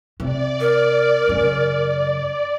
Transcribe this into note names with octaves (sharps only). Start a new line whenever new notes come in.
C3 D5
A#4
F#2 C#3